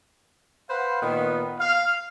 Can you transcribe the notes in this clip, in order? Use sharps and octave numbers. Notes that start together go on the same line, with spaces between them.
B4 C5 F5 F#5
A#2 D#3 B3
F5